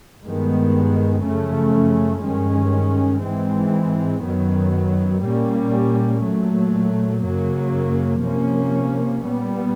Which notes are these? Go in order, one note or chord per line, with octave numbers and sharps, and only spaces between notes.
G2 D#3 G#3 B3
F#2 C#3 F3 A3 C#4
G2 D#3 G#3 C#4
G#2 E3 G#3 C4
F#2 D#3 F#3 B3
A#2 G3 A#3 C#4
A#2 F#3 A3
F#2 C#3 F#3 A#3
C3 F3 A#3 C#4
A#2 G3 B3